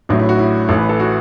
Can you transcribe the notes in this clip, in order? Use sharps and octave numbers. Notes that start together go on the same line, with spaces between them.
A1 A2 F#3 D4
E4
F#4
E4
A1 A2 E3 A4
B4
A4
F#4